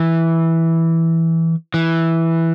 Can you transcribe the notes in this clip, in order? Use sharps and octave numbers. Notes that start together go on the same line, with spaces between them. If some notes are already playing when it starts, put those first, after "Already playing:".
Already playing: E3
E3